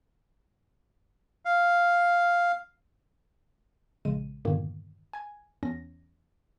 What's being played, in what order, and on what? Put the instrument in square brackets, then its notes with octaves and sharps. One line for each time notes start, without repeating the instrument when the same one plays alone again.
[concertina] F5
[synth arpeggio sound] A#1 C#3 G#3 D#7
E2 G2 A#2 D3 D#3 A#3
G#5 G#6
E2 C#4 A#6